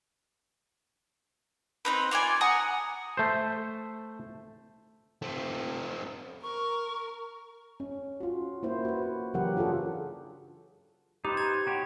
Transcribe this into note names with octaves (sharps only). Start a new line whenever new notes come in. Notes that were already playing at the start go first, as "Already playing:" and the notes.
C4 D#4 B4
F4 D5 F5 G#5
F#5 G#5 A#5 D#6
A3 C5
A3 C4
A#4 C#6
C#4
F4 F#4
A#3 E4 C5
F#4 B4
C#3 E3 F#3 G4 A#4 F#5
D4 F4 F#4 G#4 A4
D#4 G4 B4 C5
G#6
F#4 G4 C#5